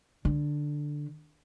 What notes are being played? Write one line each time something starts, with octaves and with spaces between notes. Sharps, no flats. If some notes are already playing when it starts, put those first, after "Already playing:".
D3